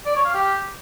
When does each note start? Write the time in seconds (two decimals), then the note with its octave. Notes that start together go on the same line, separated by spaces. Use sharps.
0.06 D5
0.15 C#5
0.24 F5
0.34 G4